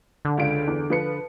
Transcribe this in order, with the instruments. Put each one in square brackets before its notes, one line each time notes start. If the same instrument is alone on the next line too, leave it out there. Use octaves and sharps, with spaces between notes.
[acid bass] D3
[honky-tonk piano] C#2 F4 D7
E2
F3 B4 C#7